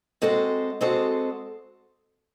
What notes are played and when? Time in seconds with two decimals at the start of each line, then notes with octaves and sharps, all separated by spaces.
0.22 G#3 C4 F#4 A4 D#5
0.81 G#3 C4 F#4 A4 D#5